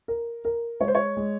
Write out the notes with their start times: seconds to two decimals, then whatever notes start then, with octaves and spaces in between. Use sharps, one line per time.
0.08 A#4
0.45 A#4
0.80 G#3 C#5
0.88 C5
0.95 C#5
1.17 G#3